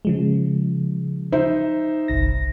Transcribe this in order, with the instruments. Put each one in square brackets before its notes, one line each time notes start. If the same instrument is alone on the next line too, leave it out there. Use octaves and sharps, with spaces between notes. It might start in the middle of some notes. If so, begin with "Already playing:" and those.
[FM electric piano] C#3 F3 G#3
[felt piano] D#4 C5 E5
[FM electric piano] G1 C2 A#6